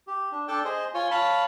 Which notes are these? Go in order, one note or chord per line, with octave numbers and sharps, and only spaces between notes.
G4
D4
D4 A4 G5 A5
G#4 C5 D#5
F4 C#5 G#5
C#5 F5 A5 B5